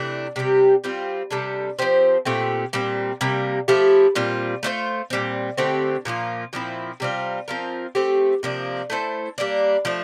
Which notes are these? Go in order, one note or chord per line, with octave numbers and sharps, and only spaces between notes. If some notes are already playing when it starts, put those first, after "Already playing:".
Already playing: C3 E3 A3 D4
C3 G3 C4 G4
G3 C4 F4
C3 G3 D4 A4
F3 C4 G4 C5
A#2 A3 C4 G4
A#2 G3 C4
C3 G3 A#3
F3 A3 E4 G4
A#2 G3 C4 F4
A3 D4 F4 C5
A#2 G3 C4
D3 A3 C4 G4
A#2 F3 A#3 F4
A#2 F3 C4 E4
C3 G3 C4 F4
F3 C4 F4 A#4
A3 C4 G4
C3 F3 A#3 D4
A3 E4 A4 C5
G3 A#3 D4
F3 A3 D4